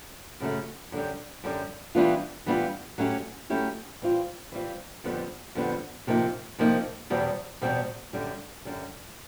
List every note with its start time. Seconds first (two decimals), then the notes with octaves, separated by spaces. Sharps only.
0.40 F#2 C#3 F#3 A3
0.92 F#2 D3 G3
1.44 F#2 D3 G3
1.95 E3 G3 B3 D4 F4
2.46 E3 G3 B3 D4 F4
2.98 F#3 A3 C#4 E4 G4
3.50 F#3 A3 C#4 E4 G4
4.02 E3 G3 C4 F4
4.52 E3 G3 C4 F4
5.04 F2 D3 G3 B3
5.55 F2 D3 G3 B3
6.07 C3 F3 A#3 D#4
6.59 C3 F3 A#3 D#4
7.10 E2 B2 G3 C4
7.62 E2 B2 G3 C4
8.13 F#2 D3 G3
8.65 F#2 D3 G3